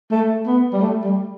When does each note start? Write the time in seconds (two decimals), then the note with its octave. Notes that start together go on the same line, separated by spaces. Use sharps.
0.11 A3
0.46 B3
0.73 G3
0.81 A3
1.04 G3